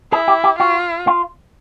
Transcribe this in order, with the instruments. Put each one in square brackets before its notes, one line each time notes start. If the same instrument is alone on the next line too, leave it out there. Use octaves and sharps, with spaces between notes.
[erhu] E4 [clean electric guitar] G#4
[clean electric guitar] G4
G4
[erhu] F4 [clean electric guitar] F#4
[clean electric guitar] F4